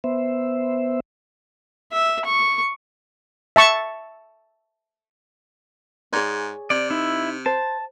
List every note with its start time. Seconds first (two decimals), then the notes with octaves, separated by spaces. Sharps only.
0.04 B3 C5 E5
1.92 E5
2.25 C#6
3.56 E5 A5 C#6
6.12 G#2 G#4 C#5 D5
6.70 C3 D5
6.90 D#4 E4
7.46 C5 A5